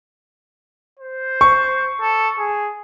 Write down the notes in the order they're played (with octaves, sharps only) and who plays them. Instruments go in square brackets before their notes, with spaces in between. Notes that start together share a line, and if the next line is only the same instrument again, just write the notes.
[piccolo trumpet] C5
[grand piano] C#6
[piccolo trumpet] A4
G#4